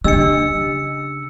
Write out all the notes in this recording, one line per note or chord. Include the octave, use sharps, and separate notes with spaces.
C#3 D4 G4 D#5 E6 C#7